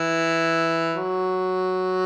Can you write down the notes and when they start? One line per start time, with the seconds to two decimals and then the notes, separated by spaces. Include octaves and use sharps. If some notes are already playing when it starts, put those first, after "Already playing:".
Already playing: E3
0.94 F#3